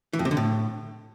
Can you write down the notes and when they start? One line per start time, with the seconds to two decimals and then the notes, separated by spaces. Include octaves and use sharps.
0.13 E3
0.19 F2
0.25 C3
0.31 D3
0.37 A2